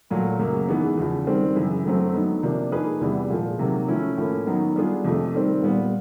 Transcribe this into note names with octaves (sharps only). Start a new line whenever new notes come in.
A#2 F#3 A3
F#2 C#3 F#3 A#3
G#2 E3 G#3 B3
E2 C#3 F3
D#3 G3 C4
F#2 C#3 E3
F#2 D3 F#3 A3 C4
D3 F#3 B3 D#4
C3 F3 A#3 D4
F3 A#3 D#4 G#4 B4
E2 C3 E3 G3 B3
A#2 F3 G#3
C3 D#3 F#3 A#3
F3 A3 C#4 E4
A2 F3 A#3 C#4
D#3 F#3 B3 D#4
G3 B3 D4 F4 G#4
F2 C3 F3 A3
D#3 G3 C4
A#2 G3 B3